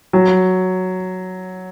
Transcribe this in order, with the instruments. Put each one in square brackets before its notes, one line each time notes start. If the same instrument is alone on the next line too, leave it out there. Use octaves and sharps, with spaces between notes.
[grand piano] F#3